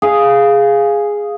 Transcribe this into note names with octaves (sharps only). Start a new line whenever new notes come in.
G#4 F5